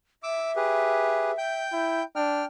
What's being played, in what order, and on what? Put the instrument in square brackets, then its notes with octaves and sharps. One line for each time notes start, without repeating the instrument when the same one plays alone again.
[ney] E5 [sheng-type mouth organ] D6 E6
[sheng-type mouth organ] G4 G#4 B4
G5 G6
[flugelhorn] E4
[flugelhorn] D4 [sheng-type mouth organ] G5 F6